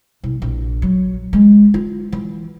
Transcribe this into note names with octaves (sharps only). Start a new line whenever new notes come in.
C2
A#1
F#3
G#3
F4
E3